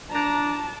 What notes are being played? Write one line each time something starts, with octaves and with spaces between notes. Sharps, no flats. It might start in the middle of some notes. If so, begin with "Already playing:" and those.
D4 A5 A#5